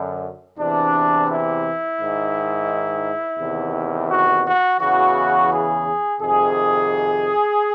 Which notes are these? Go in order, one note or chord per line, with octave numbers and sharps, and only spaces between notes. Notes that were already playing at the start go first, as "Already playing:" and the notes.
Already playing: F#2 D3
E2 C3 E3 D4
E4
G#2 D#3
E2 C3 D#3
F#4
F#4
E2 C#3 E3 F#4
G#4
F2 C3 D#3 G#4